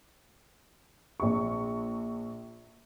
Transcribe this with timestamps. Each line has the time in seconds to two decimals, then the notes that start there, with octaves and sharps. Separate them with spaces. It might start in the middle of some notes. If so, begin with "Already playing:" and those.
1.20 A#1 C#6